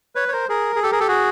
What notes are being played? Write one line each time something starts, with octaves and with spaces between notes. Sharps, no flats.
B4 C#5
C#5
A#4 C5
G#4 A#4
G#4
G4 A4
G#4 A#4
G4 A4
F#4 G#4